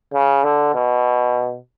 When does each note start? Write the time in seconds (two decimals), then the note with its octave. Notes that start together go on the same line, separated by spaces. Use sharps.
0.14 C#3
0.44 D3
0.75 B2